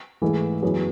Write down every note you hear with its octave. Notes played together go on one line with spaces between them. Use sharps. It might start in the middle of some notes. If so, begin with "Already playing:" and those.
G#2 E3 A3
F#2 E3 G#3 B3 F#4